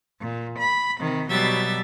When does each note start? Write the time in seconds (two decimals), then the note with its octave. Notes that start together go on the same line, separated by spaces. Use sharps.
0.21 A#2
0.58 B5
0.99 C3 D#3
1.29 B2 F#3 G3 G4 E5 A6